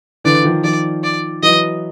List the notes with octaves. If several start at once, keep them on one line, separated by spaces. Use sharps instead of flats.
D3 E3 D5
D#3 F3
D#3 F3 D5
D5
E3 F#3 D#5